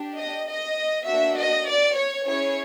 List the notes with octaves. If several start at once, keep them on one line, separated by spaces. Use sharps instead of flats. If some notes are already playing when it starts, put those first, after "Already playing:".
Already playing: D4 G4
D#5
D#5
A#3 D4 F#4 E5
D#5
D5
C#5
C#4 E4 G#4 C#5